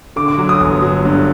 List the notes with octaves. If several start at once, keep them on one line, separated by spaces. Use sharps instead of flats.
D3 D6
D6
F#3
D#6
G1
F#3
G2